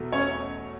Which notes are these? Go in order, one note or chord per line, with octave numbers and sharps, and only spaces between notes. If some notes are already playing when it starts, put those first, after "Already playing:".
Already playing: E2 B2 F#3 A3
C#4 C#5